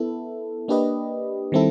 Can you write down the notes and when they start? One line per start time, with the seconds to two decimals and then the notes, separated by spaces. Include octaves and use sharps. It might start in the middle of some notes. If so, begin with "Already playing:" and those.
Already playing: B3 E4 A4
0.68 A#3 D4 G4 B4 D#5
1.52 D#3 G3 C4 E4 A4